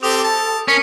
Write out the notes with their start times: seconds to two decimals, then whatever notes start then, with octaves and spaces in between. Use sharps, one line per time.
0.03 C4 G4 A4 D#6
0.24 A5
0.68 C#4 A#4 C#6 B6 C#7